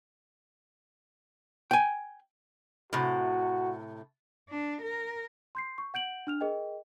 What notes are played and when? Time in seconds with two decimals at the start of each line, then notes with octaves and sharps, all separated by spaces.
1.71 G5 G#5
2.93 A2 C3 F#4
4.49 D4
4.81 A#4
5.55 C6 G6 C7
5.78 C#6
5.94 F#5 G6 D7 F#7
6.27 D4 F6 F7
6.41 G#4 A#4 D#5 G5